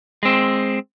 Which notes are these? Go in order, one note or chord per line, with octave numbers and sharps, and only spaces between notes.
G#3 C4